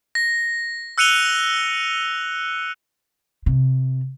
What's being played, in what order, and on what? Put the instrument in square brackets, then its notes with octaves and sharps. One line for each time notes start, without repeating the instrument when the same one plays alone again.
[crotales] A#6
E6 F#6 C#7 D#7 F7 G7
[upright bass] C3